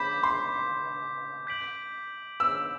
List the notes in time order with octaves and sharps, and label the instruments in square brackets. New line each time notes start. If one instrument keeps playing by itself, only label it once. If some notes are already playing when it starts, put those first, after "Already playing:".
Already playing: [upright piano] B5 [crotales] D6 G6 B6 E7
[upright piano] C6
[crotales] G6 B6 D7 F#7
[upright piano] E6